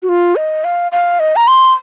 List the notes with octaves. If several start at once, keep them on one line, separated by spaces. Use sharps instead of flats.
F#4
F4
D#5
F5
F5
D#5
A#5
C6